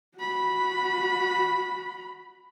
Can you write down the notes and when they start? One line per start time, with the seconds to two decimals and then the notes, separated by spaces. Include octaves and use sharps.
0.18 F#4 B5